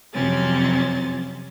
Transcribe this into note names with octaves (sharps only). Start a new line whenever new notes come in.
F2 C3 F#3 C4 C#4 A6